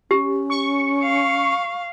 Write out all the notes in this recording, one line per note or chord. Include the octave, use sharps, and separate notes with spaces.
C#4 G4
C#6
F5